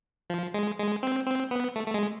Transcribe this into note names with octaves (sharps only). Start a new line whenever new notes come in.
F3
G#3
G#3
C4
C4
B3
A3
A3
G#3